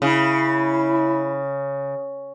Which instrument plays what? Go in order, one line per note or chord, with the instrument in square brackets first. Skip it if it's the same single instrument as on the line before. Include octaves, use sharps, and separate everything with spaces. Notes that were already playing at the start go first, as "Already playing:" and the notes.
[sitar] C#3 [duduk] E4